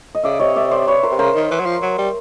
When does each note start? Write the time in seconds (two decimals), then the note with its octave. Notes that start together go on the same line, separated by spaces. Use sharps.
0.15 D#5
0.24 C#3 D5 E5
0.39 C3 C#5 D#5
0.56 D5 E5
0.71 C5 D5
0.87 B4 C#5
1.03 A#4 C5
1.11 C3
1.19 C#3 A#4 C5
1.35 D#3
1.51 E3
1.60 F#3
1.66 F3
1.82 F#3
1.98 G3